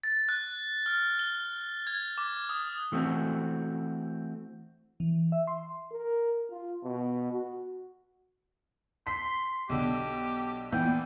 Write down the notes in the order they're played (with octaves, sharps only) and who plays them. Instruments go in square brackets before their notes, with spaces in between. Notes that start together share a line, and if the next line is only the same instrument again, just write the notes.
[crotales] A6
F#6
F6
G7
G#6
D6
D#6
[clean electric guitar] E3 A3 C4 F#4
[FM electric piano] E3
E5
C6
[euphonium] A#4
F4
B2
F#4
[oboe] C6 [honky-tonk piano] B6
[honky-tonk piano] B1 D3 [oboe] G4
[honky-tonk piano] A#2 E3 B3 [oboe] G5